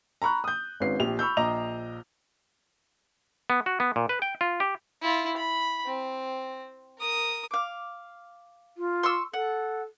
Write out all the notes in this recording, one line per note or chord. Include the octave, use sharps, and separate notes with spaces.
A#5 B5 C#6 F#6
D#6 G6
G#1 G#2 C#4 B4 C7
A#1 G4 F7
B5 C#6 E6 G6
A#1 D#5 A#5 D6 F7
B3
F#4
B3
A#2
B4
G5
F4
G4
E4 F4
B5
C4
A#4 D#6
F5 D6
F4
C6 C#6 E6
A4 F#5